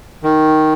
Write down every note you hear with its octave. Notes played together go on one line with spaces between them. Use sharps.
D#3